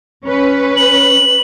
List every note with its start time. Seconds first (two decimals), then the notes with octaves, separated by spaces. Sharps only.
0.25 C#4 B4
0.76 F#7